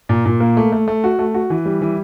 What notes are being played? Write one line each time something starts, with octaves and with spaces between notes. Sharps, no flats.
A#2
A#2
A#3
A3
A3
A3
F#4
A3
F#4
E3
G3
E3